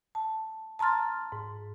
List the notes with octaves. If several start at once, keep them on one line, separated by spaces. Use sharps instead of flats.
A5
A5 A#5 C6 F6 A6
G#2